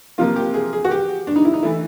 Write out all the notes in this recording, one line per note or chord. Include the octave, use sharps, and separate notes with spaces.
C3 F3 A#3 F4
G4
G#4
G#4
F#4
G4
D4
D#4
E4
D#4
E3 A3 E4